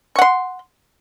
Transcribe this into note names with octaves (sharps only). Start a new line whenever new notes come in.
F#5 C6 C#6